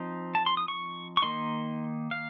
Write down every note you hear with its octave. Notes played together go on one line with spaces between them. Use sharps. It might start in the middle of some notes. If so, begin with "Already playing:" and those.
Already playing: F3 C4 D#4
A5
C6
D#6
C#6
C#6
D#3 A#3 D#4 C6
F5